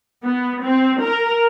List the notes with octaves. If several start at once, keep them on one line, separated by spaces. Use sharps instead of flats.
B3
C4
A#4